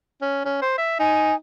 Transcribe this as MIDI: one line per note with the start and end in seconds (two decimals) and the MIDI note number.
0.22 0.44 61
0.45 0.57 61
0.62 0.74 72
0.78 0.98 76
0.99 1.33 63
0.99 1.35 80